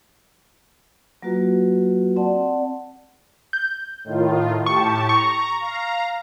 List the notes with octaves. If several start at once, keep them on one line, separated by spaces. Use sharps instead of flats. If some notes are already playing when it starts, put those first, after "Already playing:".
F#3 A#3 F4 F#4 B4
C4 D5 F#5 A5
G6
A2 D#3 F4
A2 G4 A5 C#6
A#5 C#6
F5 A#5